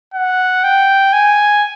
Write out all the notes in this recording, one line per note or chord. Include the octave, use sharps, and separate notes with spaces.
F#5
G5
G#5